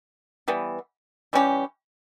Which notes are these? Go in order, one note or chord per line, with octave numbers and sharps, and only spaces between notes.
E3 G3 B3
E3 G3 C#4 G4